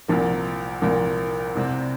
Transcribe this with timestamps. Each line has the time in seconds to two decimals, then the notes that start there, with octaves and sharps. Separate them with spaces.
0.08 C2 A#2 F3 A#3
0.81 C2 A#2 F3 A#3
1.55 C2 C3 G3 C4